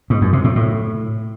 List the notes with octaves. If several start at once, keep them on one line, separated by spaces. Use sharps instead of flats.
G#2
F#2
C3
A2
A2